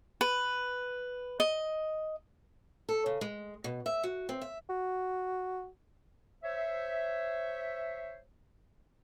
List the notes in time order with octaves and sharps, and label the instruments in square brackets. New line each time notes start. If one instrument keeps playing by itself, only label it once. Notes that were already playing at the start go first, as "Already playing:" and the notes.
[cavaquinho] B4
D#5
[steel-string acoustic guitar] A4
C#3
G#3
B2
E5
F#4
C4
E5
[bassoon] F#4
[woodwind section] C5 C#5 E5